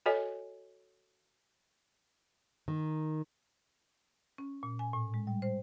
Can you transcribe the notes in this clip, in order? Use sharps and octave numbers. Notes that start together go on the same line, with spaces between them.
F#4 A4 C#5 D#5 G#5
D#3
C#4
A#2
G#5
A2
G#3
G3
C5